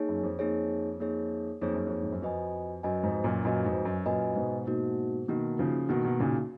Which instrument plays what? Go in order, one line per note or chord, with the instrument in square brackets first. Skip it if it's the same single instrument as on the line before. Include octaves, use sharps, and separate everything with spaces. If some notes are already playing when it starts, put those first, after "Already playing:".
Already playing: [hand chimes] A#3 D#4 G#4 C#5
[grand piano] F#2
F2
[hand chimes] A#3 D#4 G#4 C#5
A#3 D#4 G#4 C#5
[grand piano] F2 [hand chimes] A#3 D#4 G#4 C#5
[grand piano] F#2
F2
G#2
F#2
[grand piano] F2 [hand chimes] F#4 B4 D#5 G#5
[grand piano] F#2 [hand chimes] F#4 B4 D#5 G#5
[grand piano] F2 G#2
F#2 A#2
[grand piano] F#2 A#2 [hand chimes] F#4 B4 D#5 G#5
[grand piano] F2 G#2
F#2
[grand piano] F#2 A#2 [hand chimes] F#4 B4 D#5 G#5
[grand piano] G#2 B2
[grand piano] G#2 B2 [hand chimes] A#3 D#4 F#4
[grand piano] B2 D#3 [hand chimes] A#3 D#4 F#4
[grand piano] C#3 F3
[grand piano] B2 D#3 [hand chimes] A#3 D#4 F#4
[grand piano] B2 D#3
A#2 C#3